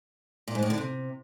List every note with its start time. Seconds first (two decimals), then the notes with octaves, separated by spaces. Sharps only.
0.48 A#2
0.55 G#2
0.63 A2
0.70 D3
0.78 C3